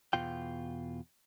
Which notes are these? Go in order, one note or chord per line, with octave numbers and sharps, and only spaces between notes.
E2 B2 F4 G5